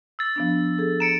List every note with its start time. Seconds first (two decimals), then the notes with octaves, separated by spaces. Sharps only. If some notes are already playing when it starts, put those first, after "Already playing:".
0.19 E6 A6
0.36 F3 B3 D4
0.78 G#4 A4
1.00 A#5 C#7 D7 E7